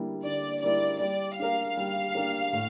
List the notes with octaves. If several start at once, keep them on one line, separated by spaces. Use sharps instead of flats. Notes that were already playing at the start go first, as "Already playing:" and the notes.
Already playing: D3 G3 A#3 E4
D3 D5
G3 A#3 E4 D5
G3 D5
D4 G4 A#4 F5
G3
D4 G4 A#4
A2